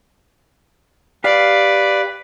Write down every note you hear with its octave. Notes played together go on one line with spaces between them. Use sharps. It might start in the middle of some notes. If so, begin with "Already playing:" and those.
G4 B4 D5 F5